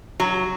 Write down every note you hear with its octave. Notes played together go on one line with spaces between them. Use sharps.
F#3